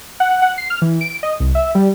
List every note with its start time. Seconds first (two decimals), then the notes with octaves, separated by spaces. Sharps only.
0.20 F#5
0.42 F#5
0.58 C7
0.70 F6
0.82 E3
1.01 D7
1.23 D#5
1.40 C2
1.55 E5
1.75 G3